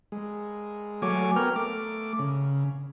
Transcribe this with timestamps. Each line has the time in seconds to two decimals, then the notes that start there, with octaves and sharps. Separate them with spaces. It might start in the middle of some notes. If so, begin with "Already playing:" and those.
0.12 G#3
1.02 F#3 A3 C#5 G#5 D6
1.36 B3 A#4 G5 F6
1.56 A3 D6
2.19 C#3